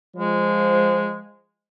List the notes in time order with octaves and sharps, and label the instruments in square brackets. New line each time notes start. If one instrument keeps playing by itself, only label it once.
[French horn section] F3 C5 [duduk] G#3